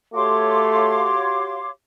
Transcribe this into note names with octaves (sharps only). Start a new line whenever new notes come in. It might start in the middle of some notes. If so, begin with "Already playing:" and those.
A3 F#4 G4 C#5 F5 C6 D6